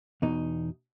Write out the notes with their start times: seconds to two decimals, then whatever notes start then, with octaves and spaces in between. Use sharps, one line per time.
0.22 E2 B2 D#4